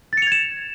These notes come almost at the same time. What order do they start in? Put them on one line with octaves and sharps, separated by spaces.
A6 C#7 F7 G#6 E7